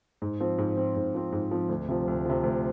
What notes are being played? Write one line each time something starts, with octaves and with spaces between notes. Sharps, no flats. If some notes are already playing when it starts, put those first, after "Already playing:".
G#2
F3 C4
G#2
F3 C4
G#2
F3 C4
G#2
F3 C4
D2
C3 F3
D2
C3 F3
D2